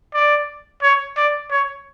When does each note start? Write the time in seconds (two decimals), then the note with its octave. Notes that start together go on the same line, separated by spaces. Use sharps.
0.14 D5
0.83 C#5
1.17 D5
1.51 C#5